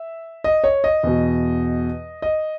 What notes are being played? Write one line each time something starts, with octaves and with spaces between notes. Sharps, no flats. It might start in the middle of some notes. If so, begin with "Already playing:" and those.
Already playing: E5
D#5
C#5
D#5
E2 B2
D#5